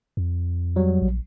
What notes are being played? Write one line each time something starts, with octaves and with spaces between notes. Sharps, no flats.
F2
F#3 G3
A#1